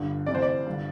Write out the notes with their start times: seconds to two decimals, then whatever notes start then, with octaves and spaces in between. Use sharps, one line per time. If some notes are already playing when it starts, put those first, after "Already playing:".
Already playing: G1 G2 D3
0.26 D2 C3 E3 D5
0.35 C5
0.42 D5
0.66 G1 G2 D3